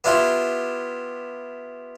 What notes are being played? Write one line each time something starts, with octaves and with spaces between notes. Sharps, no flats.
B3 D4 E4 F4 G4